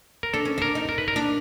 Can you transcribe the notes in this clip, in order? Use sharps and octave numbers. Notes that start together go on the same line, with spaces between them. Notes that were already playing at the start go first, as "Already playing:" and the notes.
A#4
D4 A4
C#4
D4 A#4
D#4
A#4
B4
A#4
D4